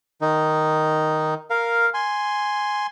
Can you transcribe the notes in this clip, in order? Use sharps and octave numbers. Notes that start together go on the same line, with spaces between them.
D#3 D#4
A#4 F5
G#5 C6